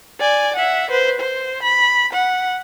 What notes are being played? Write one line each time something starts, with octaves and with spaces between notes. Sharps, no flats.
D5 G#5
E5 F#5
B4 C5
C5
B5
F#5